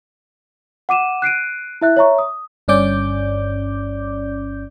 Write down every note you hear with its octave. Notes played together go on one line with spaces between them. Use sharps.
F#5 D6 D#7 E7
F#6 C7 D7 D#7
E4 E5 F#6
C#5 E5 A#5 C#6
D#6
G1 G2 C#4 D5 D6 G6